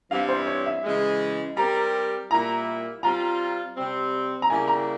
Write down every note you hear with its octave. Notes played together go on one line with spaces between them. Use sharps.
G2 E3 G3 C4 E4 F5
C5
C#5
E5
C#3 E3 G#3
G3 C4 G4 A#4 A#5
A#2 G3 A#3 E4 A#5
G3 C4 F4 A#5
C3 G3 C4
A#5
C#3 G3 A#3 E4 G4 G#5
A#5